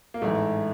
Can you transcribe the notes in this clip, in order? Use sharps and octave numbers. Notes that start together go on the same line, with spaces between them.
A#3
A1 G#2 E3 A3